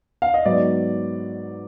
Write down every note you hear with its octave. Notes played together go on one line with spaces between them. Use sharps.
F5
D#5
G#2 F#3 B3 D5